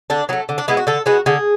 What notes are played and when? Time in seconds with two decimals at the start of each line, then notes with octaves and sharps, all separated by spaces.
0.10 D3 D4
0.29 F#3 B3
0.33 A3
0.49 D3
0.58 D4
0.68 G#3 B3 E4
0.77 F#4
0.87 D3 A4
1.06 G#3 B3 F#4
1.26 D3 G#4